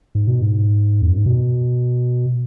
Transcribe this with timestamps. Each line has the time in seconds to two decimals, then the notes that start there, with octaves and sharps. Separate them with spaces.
0.15 G#2
0.27 B2
0.42 G#2
1.02 E2
1.09 F#2
1.17 G#2
1.26 B2